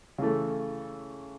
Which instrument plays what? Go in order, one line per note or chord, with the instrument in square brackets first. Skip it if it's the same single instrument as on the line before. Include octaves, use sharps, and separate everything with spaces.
[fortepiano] C#3 E3 A3